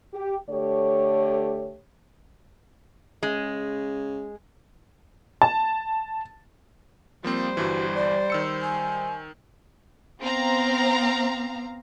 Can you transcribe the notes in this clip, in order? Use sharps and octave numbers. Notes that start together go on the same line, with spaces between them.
G4
D3 A3 G4 C#5
C#3 G#3
A5
F3 G3 A#3 C4 C5
G1 G2 E3 F#4
D5
D#3 E6 C#7
G#5
B3 C4 F5 A#5